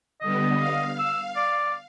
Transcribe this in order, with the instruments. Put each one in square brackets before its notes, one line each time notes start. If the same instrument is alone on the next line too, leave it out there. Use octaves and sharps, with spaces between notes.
[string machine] D3 G3 B3 [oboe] D#5
[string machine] F5
[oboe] E6
D5